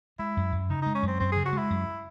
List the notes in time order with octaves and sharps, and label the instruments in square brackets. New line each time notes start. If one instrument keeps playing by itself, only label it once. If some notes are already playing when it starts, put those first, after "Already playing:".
[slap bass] G#3 [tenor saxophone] E4
[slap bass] F#2
F#2
[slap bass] C#3 [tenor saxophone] D#4
[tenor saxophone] D#4
[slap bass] G#3
[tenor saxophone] C#4
[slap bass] F#2 [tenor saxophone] C4
[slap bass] F#2 [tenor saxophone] C4
[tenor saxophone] G#4
[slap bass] C#3
[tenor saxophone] F#4
[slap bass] G#3
[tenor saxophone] E4
[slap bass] F#2